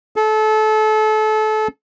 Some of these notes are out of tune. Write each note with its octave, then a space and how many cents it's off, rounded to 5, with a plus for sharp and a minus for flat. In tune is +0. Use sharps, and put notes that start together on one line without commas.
A4 -30